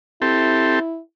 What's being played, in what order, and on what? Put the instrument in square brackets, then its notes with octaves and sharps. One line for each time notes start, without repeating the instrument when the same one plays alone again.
[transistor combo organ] C4 G4 A4 [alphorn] E4